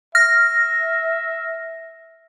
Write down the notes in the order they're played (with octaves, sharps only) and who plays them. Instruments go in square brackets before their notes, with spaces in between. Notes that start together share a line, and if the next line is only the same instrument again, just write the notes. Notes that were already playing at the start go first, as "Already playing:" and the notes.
[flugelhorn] E5 [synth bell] F6 A#6